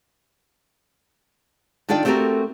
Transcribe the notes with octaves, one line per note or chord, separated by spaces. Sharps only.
D#3 D4 F4 A4 D5 G5
A3 C4 F#4 G4 A4 A#4